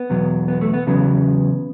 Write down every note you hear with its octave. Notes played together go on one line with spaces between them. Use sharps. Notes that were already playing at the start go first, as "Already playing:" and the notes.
Already playing: B3
E2 B2 F#3
B3
A3
B3
E2 C#3 F#3 B3